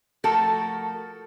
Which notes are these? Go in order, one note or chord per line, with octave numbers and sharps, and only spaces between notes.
F3 A3 F#4 A4 A#4